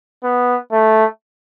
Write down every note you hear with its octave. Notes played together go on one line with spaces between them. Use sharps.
B3
A3